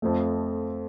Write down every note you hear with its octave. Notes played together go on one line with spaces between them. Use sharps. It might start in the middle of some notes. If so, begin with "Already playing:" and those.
F2 F3 A3